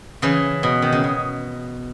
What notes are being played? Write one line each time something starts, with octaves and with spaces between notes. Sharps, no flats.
C#3 E3
B2
D#3
C#3
B2